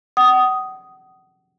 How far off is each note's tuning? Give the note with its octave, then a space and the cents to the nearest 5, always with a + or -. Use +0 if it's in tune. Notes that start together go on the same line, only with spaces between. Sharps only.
F#5 +35 D#6 +0